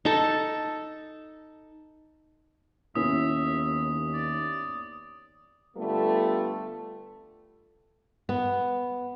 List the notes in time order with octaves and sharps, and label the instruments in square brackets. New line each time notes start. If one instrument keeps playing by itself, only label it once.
[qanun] D#4 A4
[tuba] D#2 [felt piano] B3 C#4 E4 [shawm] E5 [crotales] D#6
[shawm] D5
[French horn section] D3 G3 A3 B3 F4 A4
[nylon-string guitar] B3